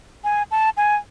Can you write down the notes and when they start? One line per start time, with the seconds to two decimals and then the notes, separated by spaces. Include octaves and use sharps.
0.24 G#5
0.51 A5
0.77 G#5